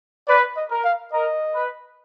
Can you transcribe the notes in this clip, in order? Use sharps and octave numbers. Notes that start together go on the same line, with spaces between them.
B4 D5
D#5
A#4
F5
A#4 D#5
B4